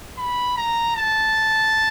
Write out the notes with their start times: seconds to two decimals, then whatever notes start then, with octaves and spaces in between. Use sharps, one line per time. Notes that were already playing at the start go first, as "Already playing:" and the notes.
0.18 B5
0.57 A#5
0.96 A5